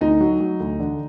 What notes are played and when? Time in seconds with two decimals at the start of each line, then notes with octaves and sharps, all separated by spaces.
0.01 D2 D#4
0.20 F#3
0.40 F#3
0.60 D2
0.80 D3